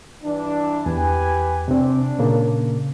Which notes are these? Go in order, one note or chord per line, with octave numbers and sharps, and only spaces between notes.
G2 E3 D4
E2 G4 B4 G#5
C3 C4 D4
A#2 C#3 A#3